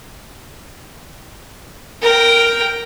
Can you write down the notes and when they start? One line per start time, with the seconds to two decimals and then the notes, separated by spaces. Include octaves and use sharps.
2.02 A#4 G5